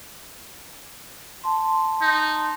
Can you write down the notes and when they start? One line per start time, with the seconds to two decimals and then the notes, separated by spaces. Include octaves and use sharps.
1.44 A5 C6
2.02 D#4